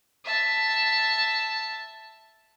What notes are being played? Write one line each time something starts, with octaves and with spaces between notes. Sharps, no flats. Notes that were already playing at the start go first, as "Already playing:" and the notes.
E5 A5